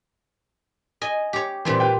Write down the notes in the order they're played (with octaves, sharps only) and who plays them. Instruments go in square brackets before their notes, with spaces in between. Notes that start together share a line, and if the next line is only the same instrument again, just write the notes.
[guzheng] D#5 G#5
G4 C#5
[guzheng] A#2 G3 C5 [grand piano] E3 C4
[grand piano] G4 B4 G5